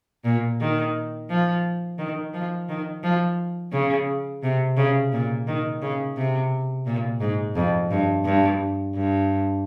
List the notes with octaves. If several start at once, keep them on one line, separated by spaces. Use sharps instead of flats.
A#2
D#3
F3
D#3
F3
D#3
F3
C#3
C3
C#3
A#2
D#3
C#3
C3
A#2
G#2
F2
G2
G2
G2